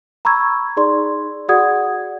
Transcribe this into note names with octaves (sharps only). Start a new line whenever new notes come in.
A#5 B5 C#6 E6 G#6
D#4 G#4 D5 C6
F#4 G#4 D5 F#5 D#6 G#6